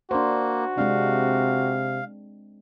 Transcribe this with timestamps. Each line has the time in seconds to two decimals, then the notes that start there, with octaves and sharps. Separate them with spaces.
0.11 A#3 D4 F#4 C5
0.78 C3 G#3 C4 D4 F5